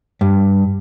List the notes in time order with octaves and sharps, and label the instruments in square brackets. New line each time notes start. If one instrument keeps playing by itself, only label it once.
[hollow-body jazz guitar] G2